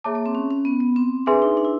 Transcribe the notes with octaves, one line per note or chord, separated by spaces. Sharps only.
A#3 G#4 C#5 E5 A5 D6
A#3
C4
C#4
C#4
B3
B3
C4
D4 G#4 B4 E5 G#5 C6
D#4
D4
E4